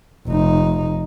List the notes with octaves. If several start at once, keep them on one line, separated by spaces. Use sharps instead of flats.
F1 D#4